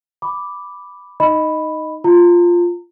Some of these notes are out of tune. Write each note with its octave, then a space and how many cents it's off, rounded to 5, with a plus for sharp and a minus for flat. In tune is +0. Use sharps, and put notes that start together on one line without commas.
B5 +0 D6 +0
D#4 +0 D#5 +0 B5 +0
F4 +0 A#5 -35